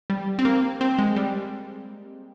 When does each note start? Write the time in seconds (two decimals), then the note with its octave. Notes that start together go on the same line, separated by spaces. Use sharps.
0.10 G3
0.39 C4
0.45 A#3
0.81 C4
0.99 G#3
1.16 G3